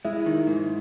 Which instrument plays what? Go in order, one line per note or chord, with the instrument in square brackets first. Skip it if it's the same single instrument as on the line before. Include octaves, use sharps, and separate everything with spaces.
[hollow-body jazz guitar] G#3 [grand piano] E4 E5
[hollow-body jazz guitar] D#3
G#2